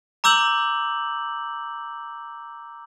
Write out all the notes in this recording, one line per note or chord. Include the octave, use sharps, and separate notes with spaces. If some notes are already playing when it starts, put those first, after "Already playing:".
A#5 D6 E6 G6 F#7